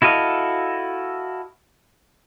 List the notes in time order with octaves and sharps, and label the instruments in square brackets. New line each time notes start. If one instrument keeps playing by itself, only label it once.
[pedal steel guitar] E4 F#4 A4 D#5 F5